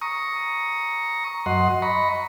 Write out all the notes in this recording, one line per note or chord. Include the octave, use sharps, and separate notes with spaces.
A#5 C#6 D#6
F#2 D#5 F#5 C6
D#5 A#5 B5 C#6